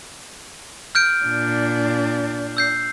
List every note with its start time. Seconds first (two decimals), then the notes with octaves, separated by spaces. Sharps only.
0.95 F6 G6 D7
1.24 A#2 D4
2.57 E6 G6 C7